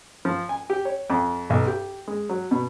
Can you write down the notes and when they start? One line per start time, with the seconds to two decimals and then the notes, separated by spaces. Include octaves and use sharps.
0.25 F3
0.49 G#5
0.70 G4
0.85 C#5
1.10 F2
1.50 B1
1.67 G4
2.08 G#3
2.29 F#3
2.51 B2